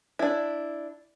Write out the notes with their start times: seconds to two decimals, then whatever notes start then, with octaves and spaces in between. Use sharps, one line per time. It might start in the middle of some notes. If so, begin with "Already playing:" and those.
0.19 D4 E4